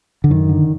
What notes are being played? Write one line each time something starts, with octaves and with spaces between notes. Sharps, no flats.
D3
F#2 D#3
D3